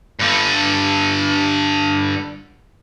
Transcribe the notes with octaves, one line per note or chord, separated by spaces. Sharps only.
G2 D3